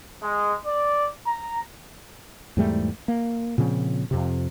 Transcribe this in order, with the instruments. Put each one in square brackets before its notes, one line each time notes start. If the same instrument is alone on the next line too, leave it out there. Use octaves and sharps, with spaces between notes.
[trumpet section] G#3
D5
A#5
[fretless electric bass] E2 G#2 G3 A3
A#3
A#2 C#3 F3 C4
F2 C3